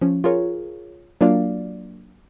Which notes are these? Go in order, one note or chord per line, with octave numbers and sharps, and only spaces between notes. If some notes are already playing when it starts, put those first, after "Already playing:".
F3 C#4
F4 G#4 A#4 C#5
F#3 A#3 D4 F4 D5 F5